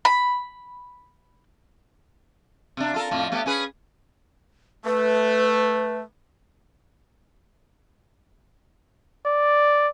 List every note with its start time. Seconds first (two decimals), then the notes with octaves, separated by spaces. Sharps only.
0.05 B5
2.77 C3 D4
2.94 F4 A4 A#4
3.11 F2 A2 F3
3.32 A3 B3 G4
3.46 C#4 G#4 B4
4.85 A3 B4
9.26 D5